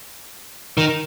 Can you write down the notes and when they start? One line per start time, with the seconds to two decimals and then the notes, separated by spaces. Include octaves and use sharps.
0.78 D#3